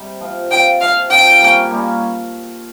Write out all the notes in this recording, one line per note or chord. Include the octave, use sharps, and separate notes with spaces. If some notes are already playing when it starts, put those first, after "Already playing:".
Already playing: C3 G3
F3 C4 F4
F3 C4 F4 G5
F3 C4 F4 F5
F3 C4 F4 G5
G3 A#3 C#4
G3 A#3 C#4